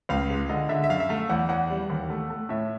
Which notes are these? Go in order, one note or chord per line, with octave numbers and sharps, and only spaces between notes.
C#2 F5
G#3
D3 D#5
D3 E5
E5
F#2 F5
E5
A3 F5
E2 F#5
E2 F#5
G3
D#2
A3
A3
A2 E5